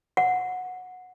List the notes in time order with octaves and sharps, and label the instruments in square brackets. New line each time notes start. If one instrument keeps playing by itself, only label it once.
[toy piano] F#5